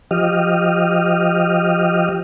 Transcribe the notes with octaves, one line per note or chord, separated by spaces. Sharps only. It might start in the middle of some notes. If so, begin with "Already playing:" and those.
F3 G4 D#5 F6